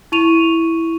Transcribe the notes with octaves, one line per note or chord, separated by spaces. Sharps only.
E4 C#6 D#7 F7